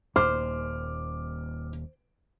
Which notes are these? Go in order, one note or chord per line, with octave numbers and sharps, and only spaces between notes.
D#1 D#2 A#2 C5 D6 F6